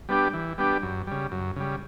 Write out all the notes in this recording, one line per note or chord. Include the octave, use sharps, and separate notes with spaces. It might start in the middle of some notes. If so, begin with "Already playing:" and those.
G3 B3 D4 G4
E3
G3 B3 D4 G4
F#2
C#3 G3
F#2
C#3 G3